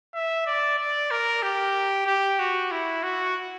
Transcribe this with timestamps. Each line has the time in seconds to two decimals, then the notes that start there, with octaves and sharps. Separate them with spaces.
0.14 E5
0.46 D5
0.79 D5
1.11 A#4
1.43 G4
2.07 G4
2.39 F#4
2.71 E4
3.03 F#4